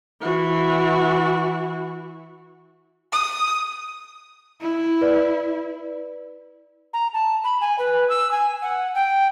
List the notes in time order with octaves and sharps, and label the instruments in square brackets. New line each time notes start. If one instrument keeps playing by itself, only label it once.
[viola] E3 F#4
[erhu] D#6
[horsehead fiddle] E4
[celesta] B4 D5
[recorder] A#5
A5
B5
G#5
B4
E6
G#5
F#5
G5